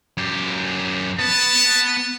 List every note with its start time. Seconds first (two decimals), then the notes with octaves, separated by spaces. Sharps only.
0.17 F#2 G4
1.19 B3 B4 A5